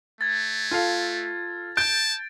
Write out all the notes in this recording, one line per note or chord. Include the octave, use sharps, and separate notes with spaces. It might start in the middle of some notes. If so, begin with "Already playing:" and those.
A3 G#6 A6
F4 A4 F5
A5 G6 A6 D7